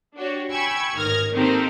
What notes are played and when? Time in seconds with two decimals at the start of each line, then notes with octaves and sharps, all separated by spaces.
0.16 D4 F#4 G4 C#5
0.51 G5 G#5 B5 C#6 E6 G#6
0.94 A1 G#2 D#3 F6 G#6 A#6
1.32 D#3 A#3 C4 G4 A4 A#4